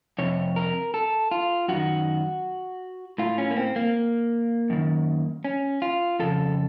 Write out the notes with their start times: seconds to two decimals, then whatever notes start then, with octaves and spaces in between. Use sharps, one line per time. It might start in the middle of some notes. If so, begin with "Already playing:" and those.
0.18 F2 C3 C#5
0.56 A#4
0.94 A4
1.31 F4
1.68 F#2 D#3 F#4
3.18 A2 F4
3.38 C#4
3.51 A#3
3.57 C4
3.76 A#3
4.70 F#2 D#3
5.45 C#4
5.82 F4
6.19 F2 C#3 A4